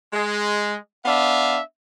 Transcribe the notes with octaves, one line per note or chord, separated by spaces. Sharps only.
G#3
B3 D4 E5 F5